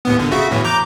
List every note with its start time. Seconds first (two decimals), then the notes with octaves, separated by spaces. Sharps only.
0.05 D#2 A2 B3
0.19 G#1 D3
0.31 C#3 F#4 E5
0.51 E2 A2 E3
0.64 A#5 D6 G6